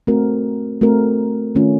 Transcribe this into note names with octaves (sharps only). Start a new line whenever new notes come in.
A3 C4 F#4 A#4
A3 C4 F#4 A#4
D#3 A3 C#4 F4